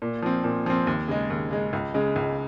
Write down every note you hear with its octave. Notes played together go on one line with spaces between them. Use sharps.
A#2
F3 C4
A#2
F3 C4
D#2
C#3 G#3
D#2
C#3 G#3
C#2
C#3 G#3
C#2